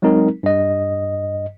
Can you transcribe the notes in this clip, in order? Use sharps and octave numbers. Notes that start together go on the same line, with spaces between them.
F#3 G#3 C4 D#4 A#4
G2 D#5